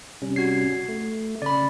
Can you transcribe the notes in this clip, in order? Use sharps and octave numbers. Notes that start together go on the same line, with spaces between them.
C3 G3 C#4
F#4 G#6 C7
A3
C#3 D5 B5